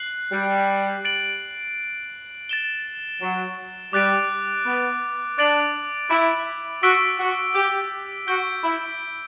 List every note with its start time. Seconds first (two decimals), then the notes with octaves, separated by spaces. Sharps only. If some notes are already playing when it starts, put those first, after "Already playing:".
Already playing: F#6 C7 F#7
0.32 G3
1.05 A6 D7 F#7
2.49 A6 E7 G7
3.22 F#3
3.93 G3 D6 F#6 A6 D7
4.66 B3
5.38 D4 D6 A6 D7 F#7
6.10 E4
6.83 F#4 E6 B6 D7 G7
7.19 F#4
7.55 G4
8.27 F#4 G6 D7 G7
8.64 E4